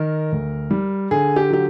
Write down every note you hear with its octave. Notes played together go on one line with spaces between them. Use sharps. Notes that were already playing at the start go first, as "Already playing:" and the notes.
Already playing: D#3 A#4
D2
G3
D3 G#4
G4
F#3 G4